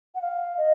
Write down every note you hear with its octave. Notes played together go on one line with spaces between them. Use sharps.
F#5
F5
D#5